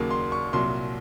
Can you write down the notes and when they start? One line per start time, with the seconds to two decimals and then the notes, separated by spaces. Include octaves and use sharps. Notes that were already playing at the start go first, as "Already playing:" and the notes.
Already playing: D#2 C#3 F#3 A#3
0.10 C6
0.32 C#6
0.53 C2 A#2 F#3 C6